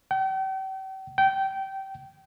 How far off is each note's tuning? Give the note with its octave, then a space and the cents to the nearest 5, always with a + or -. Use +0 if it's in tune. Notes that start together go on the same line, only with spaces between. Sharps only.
G5 -40
G5 -20